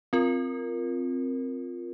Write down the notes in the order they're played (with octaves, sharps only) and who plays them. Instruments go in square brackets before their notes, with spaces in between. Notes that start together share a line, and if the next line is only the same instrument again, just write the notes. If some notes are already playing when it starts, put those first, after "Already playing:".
[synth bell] C4 F4 A#4